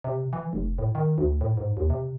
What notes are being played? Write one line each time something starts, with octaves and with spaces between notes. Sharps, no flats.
C3
E3
F1
A2
D#3
D2
A2
G#2
D#2
C3